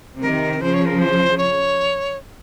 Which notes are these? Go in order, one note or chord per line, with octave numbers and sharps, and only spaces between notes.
C3 D#3 A#4
C#3 F3 C5
C#5
A#4
C5
C#5